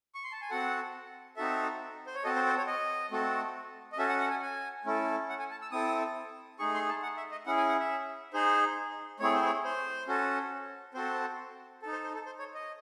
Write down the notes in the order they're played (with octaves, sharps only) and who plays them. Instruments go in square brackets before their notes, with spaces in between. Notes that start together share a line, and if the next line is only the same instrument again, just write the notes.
[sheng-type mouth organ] C#6
C6
A5
G#5
C4 F#4 A4 F#5
C4 D#4 F#4 A4 E5
C5
C#5
C4 F#4 A4 D#5
C5
C5
C#5
D#5
A3 C4 F#4 A4
D#5
C#4 F#4 A4 E5
F#5
F#5
G#5
G#5
A3 C#4 E4 A4
F#5
G#5
A5
E6
C4 E4 A4 D#6
A3 D#4 G#4 C#6
C6
A5
F#5
E5
D#5
C#4 E4 G#4 F#5
G#5
F#5
E5
D#4 G#4 C5
A3 C4 E4 G#4 C#5
C5
C#5
C5
C#4 F#4 A4
C4 F#4 A4 C5
D#4 A4
C5
C5
A4
C5
C#5
D#5